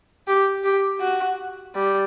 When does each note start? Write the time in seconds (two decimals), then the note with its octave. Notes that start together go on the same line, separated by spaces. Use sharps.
0.27 G4
0.64 G4
1.01 F#4
1.75 G3